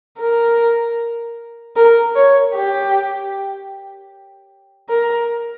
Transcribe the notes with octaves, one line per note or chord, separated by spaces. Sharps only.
A#4
A#4
C#5
G4
A#4